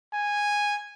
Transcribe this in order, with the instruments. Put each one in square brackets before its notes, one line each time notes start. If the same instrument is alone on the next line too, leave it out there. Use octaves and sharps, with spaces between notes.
[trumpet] G#5